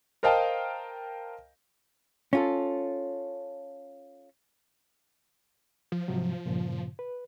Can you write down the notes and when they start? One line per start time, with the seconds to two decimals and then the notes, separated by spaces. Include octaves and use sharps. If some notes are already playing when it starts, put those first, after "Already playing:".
0.23 A#4 C5 D#5 F5 G5 A5
2.33 C#4 F4 A4
5.92 F3
6.08 G#2 C3 F#3
6.46 G2 A#2 C#3
6.99 B4